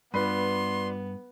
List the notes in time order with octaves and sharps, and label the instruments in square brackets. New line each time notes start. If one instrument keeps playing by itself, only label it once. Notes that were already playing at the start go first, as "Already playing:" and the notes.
[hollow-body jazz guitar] G2 [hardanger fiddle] B3 [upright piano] D4 F4 B4 [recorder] C6